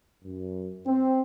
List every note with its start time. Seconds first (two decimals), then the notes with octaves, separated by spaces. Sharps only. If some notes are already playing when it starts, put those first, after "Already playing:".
0.25 F#2
0.87 C4